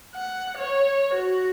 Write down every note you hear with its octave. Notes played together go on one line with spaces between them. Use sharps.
F#5
C#5
F#4